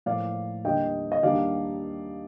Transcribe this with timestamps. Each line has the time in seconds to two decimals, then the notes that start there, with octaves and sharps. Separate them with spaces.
0.06 A2 F3 A#3 D5 F5
0.64 D#2 D3 G3 A#3 D4 D#5 G5
1.12 D#5
1.23 D#2 D#3 G3 A#3 D4 D5 F5